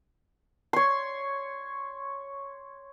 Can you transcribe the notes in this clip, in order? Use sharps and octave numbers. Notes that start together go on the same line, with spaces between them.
C#5 C6